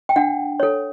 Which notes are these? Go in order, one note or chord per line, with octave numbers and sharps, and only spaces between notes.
G5
D4 F#5
A4 C#5